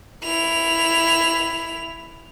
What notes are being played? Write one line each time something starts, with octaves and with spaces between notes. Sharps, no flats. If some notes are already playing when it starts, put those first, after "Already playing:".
E4 F7